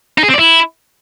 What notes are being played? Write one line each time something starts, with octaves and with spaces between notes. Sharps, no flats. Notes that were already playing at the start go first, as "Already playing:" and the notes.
D#4
G#4
C4
D5
E4